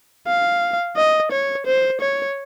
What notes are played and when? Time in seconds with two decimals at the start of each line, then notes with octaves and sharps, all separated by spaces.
0.28 F5
0.96 D#5
1.32 C#5
1.66 C5
2.01 C#5